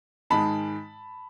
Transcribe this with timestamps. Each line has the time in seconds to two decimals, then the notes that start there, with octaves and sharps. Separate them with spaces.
0.30 G#2 D#3 G#3 A5 B5